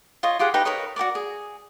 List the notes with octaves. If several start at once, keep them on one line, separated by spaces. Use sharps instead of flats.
F4 C#5 D#5
F4 G4 G#4 F#5
D#4 G4 B4 B5
A#4 B4 C#5 D#5
F#4 G4 A#4 D5
G#4